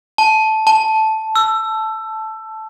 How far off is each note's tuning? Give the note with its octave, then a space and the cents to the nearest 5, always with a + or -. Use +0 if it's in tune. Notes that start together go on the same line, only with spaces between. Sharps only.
A5 -10
A5 -5
E6 +20